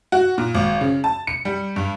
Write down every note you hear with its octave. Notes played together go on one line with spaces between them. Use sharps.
F#4
A#2
G#1
C#3
A5
C#7
G3
G2